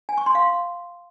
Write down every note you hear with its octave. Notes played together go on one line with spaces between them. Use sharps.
G#5
C#6
C6
F5